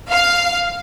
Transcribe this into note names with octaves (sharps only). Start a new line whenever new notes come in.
F5